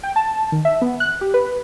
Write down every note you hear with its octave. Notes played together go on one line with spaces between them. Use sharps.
G5
A5
D#3
E5
B3
F#6
G4
B4